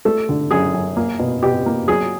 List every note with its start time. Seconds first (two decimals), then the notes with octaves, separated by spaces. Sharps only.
0.05 A3 A4
0.29 D3
0.51 F#2 G#4
0.74 F#2
0.97 A#3
1.19 B2
1.43 B2 G4
1.66 A#3
1.88 F#3 G#4